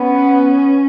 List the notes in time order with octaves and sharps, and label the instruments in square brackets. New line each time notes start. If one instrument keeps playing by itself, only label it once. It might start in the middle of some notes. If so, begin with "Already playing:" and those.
Already playing: [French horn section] B3 [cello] C#4